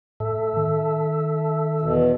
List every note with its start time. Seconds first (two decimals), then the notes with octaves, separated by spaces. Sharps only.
0.20 A2 A4 E5
0.57 D#3
1.81 E2 B2